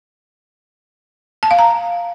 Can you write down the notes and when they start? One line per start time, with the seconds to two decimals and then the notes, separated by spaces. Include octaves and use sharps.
1.43 A5
1.51 F5
1.59 A#5